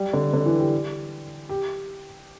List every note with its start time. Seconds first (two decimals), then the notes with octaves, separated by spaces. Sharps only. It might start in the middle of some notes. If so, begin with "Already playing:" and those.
Already playing: G3
0.13 D3
0.34 D3
0.46 E3
0.60 G4
1.49 G4